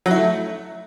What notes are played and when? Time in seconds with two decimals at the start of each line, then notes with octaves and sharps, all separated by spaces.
0.06 F#3
0.11 E4
0.16 A3